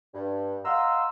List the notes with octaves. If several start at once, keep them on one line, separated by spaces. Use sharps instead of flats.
G2
D#5 F5 F#5 A#5 C6 E6